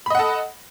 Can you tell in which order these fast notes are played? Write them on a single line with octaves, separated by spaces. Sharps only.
B5 D#5 F#5 A4